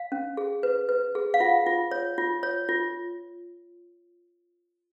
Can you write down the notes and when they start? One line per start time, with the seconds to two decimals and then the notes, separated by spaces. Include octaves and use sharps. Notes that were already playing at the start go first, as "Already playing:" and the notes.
Already playing: F5
0.12 C#4
0.37 G#4
0.63 B4
0.89 B4
1.15 G#4
1.34 F5
1.40 F4 F#5
1.66 F4
1.91 C#5
2.18 F4
2.43 C#5
2.69 F4